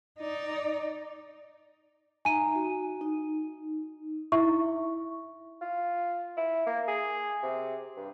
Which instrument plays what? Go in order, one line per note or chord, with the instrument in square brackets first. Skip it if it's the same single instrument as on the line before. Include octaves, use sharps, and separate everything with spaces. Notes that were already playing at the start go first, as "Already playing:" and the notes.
[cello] D#4 D5
[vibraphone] D#4 E5 A#5 [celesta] G#5 D#7
[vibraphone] F#4
D#4
[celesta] E4 E5 C#6
[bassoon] F4
E4
A#3
G#4
C3
G2